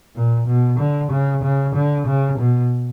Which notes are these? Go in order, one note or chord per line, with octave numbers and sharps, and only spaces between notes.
A#2
B2
D3
C#3
C#3
D3
C#3
B2